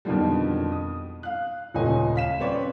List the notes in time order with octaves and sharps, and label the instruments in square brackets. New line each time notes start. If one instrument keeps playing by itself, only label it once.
[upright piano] F2 B2 D3 D#3 F3 G3
D#6
F5 F#6
D#1 C#2 A3 C#5 D#5 G#5
F5 B6 E7
C4 C#4 B4 C#5 D5